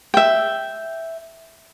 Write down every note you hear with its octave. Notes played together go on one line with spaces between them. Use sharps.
E5 G5